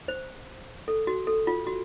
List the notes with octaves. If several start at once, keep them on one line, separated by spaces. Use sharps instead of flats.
C5
A4
F#4
A4
F4
F#4